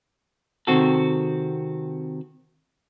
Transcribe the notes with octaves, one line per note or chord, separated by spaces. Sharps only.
C3 D#3 C4 F#4 A4